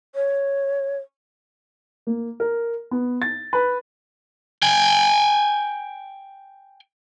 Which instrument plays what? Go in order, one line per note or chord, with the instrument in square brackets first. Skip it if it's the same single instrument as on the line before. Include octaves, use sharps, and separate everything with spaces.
[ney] C#5
[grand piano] A#3
A#4
B3
A6
B4
[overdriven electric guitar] G5 G#5